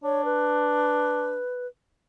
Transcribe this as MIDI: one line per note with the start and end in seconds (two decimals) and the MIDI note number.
0.04 1.40 62
0.04 0.23 73
0.25 1.67 71